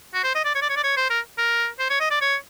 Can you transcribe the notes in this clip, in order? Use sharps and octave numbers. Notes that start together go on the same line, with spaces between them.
F#4
C5
D#5
D5
C#5
D5
C#5
D5
C#5
C5
A#4
A#4
C5
C#5
D#5
D5
C#5